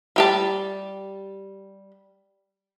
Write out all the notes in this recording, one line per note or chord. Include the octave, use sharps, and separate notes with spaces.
G3 G4 A5